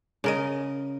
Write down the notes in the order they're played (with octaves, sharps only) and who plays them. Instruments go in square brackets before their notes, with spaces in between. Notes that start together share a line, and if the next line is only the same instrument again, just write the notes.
[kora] C#3 A#4 D#5